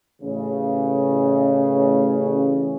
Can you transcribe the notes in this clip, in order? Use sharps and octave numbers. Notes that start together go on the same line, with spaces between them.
A1 C#3